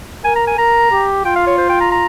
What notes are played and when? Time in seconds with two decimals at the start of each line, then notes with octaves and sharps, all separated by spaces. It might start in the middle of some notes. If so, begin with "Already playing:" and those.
0.24 A#4 G#5
0.36 A#5
0.47 G#5
0.58 A#4 A#5
0.91 G4
1.25 F4 G5
1.36 F5
1.47 C#5
1.58 C5
1.70 G5
1.81 A#5
1.92 A#5